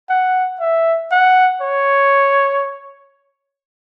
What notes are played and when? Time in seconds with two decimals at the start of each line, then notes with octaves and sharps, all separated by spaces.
0.10 F#5
0.60 E5
1.12 F#5
1.62 C#5